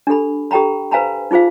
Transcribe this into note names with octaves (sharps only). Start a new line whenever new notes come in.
D4 G4 A4 B5
G4 A4 G5 A#5 B5
B4 C5 F5 G#5 A#5 B5
D#4 F4 G#4 C5 F5